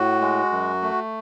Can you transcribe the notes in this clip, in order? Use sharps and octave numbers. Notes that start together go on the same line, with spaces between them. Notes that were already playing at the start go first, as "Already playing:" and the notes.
Already playing: A2 F#4
G#3
F#2
A3